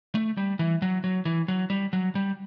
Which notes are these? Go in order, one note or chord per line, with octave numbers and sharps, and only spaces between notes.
A3
G3
E3
F#3
F#3
E3
F#3
G3
F#3
G3